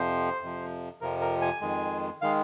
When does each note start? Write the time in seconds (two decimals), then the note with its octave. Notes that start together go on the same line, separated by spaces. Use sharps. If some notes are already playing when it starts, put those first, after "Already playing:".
Already playing: F2 C3 F3 C5
0.41 F2 C3 F3
1.01 F2 C3 F3 A#4
1.21 A#4
1.42 G#5
1.62 F2 D#3 G#3
2.22 D#3 G#3 F5